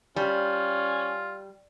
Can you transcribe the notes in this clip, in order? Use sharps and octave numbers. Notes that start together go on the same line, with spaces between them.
G3 C#4 F4